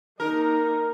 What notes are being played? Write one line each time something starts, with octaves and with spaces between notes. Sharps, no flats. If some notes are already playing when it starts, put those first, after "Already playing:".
A#3 D#4 A#4